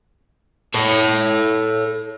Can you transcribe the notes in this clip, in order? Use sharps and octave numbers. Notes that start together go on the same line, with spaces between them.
A4 C#5